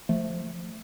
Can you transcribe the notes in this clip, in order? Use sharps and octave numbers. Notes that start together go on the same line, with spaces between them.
F3 A3